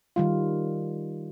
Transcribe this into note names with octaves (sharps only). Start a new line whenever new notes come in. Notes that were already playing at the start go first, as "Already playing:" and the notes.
D#3 G3 F4